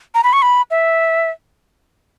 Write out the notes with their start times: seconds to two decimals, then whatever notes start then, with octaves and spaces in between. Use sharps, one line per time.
0.15 A#5
0.24 B5
0.33 C#6
0.42 B5
0.71 E5